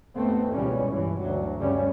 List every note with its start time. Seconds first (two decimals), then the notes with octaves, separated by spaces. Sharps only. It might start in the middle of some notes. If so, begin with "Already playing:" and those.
0.15 G#1 D#2 A3 B3 C4
0.53 C#2 B2 E3 G3 C#4
0.89 G2 E3
1.20 D2 F#3
1.58 G2 C#3 G3 C#4